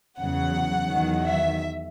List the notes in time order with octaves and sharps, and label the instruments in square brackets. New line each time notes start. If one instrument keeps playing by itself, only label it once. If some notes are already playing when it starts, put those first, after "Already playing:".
[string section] E2 C#3 F#3 F#5
E2 D#3 F#3
E5